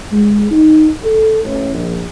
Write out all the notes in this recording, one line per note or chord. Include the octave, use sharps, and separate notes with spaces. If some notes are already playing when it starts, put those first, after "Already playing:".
G#3
D#4
A4
A1
A#1